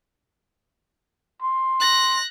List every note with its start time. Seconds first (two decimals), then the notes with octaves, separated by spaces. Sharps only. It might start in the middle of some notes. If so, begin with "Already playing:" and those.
1.42 C6
1.80 F#6 A#6